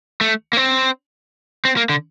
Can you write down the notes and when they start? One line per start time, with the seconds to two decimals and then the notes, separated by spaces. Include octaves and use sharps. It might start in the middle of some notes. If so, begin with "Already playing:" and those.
0.21 A3
0.53 A#3
0.57 C4
1.65 C4
1.77 A#3
1.89 D3